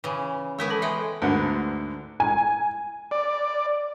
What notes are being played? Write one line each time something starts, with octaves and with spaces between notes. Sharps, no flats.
C#3 E3
G#3 B3 E4 A#4 C#5
E3 A4 A5
G#3 A4 E5 G5
D2 G#2 D3 A#4 B4 F#5
G#5
D5